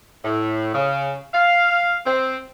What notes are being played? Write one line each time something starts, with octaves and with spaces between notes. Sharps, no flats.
A2
C#3
F5
C4